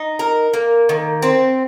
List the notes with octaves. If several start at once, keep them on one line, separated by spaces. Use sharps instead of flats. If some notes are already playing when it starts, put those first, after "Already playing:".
Already playing: D#4
A#4
A#3
D#3
C4